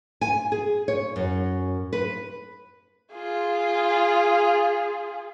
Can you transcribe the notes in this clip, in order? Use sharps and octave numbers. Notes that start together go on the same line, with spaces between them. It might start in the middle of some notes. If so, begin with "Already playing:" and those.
G#5
G#4
C#5
F#2
B4
F4 G#4